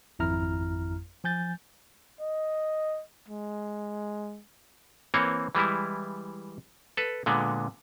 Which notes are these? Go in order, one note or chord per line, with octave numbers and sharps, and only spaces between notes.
G#1 F2 E4 A#5 F6
F3 G#5 G6 A6
D#5
G#3
E3 A#3 C4 C#5
E3 G3 G#3 E4
A4 B4
A#2 D3 G#3 B3